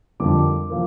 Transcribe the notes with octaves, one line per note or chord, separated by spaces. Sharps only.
F2 D3 G3 A#3 D6
F3 A#3